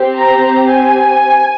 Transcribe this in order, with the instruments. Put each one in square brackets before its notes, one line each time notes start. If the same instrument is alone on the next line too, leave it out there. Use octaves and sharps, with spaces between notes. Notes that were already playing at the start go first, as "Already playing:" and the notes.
Already playing: [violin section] C4 G4
A#5
G#5